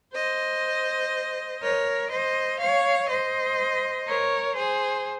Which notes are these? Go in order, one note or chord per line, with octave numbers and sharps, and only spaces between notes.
C5 D#5
A#4 C#5
C5 D#5
C#5 F5
C5 D#5
A#4 C#5
G#4 C5